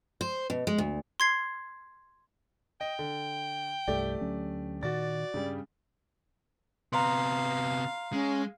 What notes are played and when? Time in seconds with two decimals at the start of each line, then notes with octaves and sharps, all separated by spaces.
0.21 C5
0.50 B2
0.67 G#3
0.78 D2
1.20 C6 G#6 C7
2.81 D#5 G5
2.99 D3
3.88 C2 G2 A3 G4 D5
4.21 D2 F#3 C#4
4.83 A#2 D#3 F#4 D5 A6
5.34 G2 C#3 G3
6.93 C3 B3 F5 A#5 C6
8.13 G#3 C#4